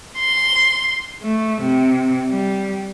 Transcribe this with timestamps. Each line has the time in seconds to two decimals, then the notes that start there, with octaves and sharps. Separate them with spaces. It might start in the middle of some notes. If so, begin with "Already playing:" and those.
0.18 C6
1.22 A3
1.61 C3
2.30 G3